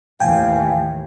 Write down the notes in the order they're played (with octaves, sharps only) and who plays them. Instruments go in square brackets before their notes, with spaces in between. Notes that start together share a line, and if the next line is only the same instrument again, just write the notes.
[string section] D#2 A2 E3 [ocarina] F5 [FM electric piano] G5 G#5